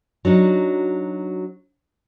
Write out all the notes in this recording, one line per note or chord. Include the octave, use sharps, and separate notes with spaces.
F#3 D4 D#4 F#4